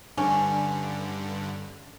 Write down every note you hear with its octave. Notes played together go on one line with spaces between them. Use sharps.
G2 D3 C#4